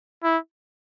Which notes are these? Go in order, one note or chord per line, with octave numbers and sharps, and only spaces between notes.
E4